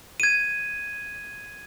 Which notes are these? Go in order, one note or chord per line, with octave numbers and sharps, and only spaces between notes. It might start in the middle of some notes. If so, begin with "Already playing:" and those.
G#6 D#7